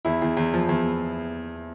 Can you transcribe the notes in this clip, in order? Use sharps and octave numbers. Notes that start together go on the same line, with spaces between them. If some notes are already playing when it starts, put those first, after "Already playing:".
E2 E4
E2
E2
F3
E2